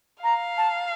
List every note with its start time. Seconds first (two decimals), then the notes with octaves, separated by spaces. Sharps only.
0.23 F5 A#5
0.57 A5